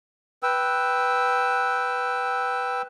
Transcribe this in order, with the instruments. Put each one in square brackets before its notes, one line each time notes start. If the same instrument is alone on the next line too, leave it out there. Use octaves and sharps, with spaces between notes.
[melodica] B4 G5 E6